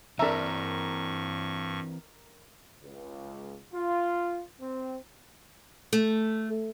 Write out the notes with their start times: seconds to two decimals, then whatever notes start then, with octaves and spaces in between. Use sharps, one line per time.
0.19 G2 E3 C4 D4 A#4 E5 A#5 C#6
2.83 C#2
3.73 F4
4.60 C4
5.93 A3